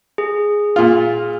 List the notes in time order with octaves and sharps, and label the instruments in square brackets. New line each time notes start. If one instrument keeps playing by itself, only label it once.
[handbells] G#4
[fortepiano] A#2 F4